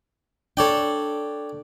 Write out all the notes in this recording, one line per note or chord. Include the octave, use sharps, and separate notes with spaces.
D4 A4 C#5 D5 G5